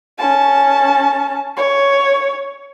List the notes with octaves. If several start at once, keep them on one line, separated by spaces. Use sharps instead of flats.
C#4 A5
C#5